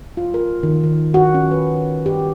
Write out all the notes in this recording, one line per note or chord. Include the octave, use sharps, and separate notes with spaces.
F4
A#4
D#3
D#3
F#4
C#4
B4
G4